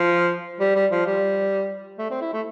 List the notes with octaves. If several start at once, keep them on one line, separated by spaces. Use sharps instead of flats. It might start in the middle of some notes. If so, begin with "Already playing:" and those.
Already playing: F3
G3
G3
F3
G3
A3
C4
E4
A3